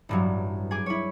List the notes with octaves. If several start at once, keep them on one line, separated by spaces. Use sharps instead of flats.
A1 G2 F#3
G#4 G#5 D6
E4 C#5